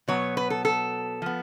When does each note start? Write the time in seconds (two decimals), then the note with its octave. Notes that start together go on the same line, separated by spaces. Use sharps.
0.08 B2 F#3 B3 C#5
0.37 B4
0.50 A4
0.65 A4
1.22 F3 B3